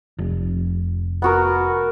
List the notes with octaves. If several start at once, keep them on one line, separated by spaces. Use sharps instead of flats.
F1
B3 F#4 A#4